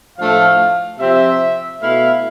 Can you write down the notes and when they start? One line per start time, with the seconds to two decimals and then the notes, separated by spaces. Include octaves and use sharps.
0.17 A2 F3 A3 D4 F5
0.99 C3 F3 C4 E5
1.81 B2 A3 E4 F5